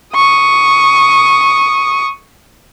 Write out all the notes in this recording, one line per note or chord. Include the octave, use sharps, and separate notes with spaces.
C#6 D#6